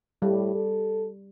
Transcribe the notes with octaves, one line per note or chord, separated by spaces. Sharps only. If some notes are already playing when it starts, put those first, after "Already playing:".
A2 G3
A4